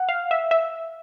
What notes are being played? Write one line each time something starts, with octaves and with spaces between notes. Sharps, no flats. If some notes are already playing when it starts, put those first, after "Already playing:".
Already playing: F#5
F5
E5
E5